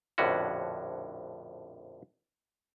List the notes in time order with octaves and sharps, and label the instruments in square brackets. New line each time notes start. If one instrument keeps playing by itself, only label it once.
[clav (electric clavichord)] A#1 F2 A2 D3 C#4 F#4